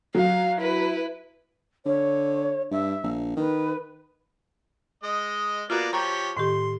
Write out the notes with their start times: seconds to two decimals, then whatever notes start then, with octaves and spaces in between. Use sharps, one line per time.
0.15 F#3 F5
0.58 E4 B4
1.86 D3 C#5
2.71 G2 E5
3.03 A#1
3.37 D#3 B4
5.03 G#3 D#5
5.70 A#3 B3 F4 F#4 D5
5.93 F3 G4 C#5 A#5
6.37 A2 D#3 G4 C6